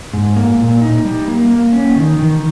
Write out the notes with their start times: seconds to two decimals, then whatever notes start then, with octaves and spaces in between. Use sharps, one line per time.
0.13 G#2
0.36 A#3
0.59 A#2
0.81 D#4
1.05 G3
1.28 A#3
1.50 A#3
1.73 C#4
1.96 D#3
2.19 D#3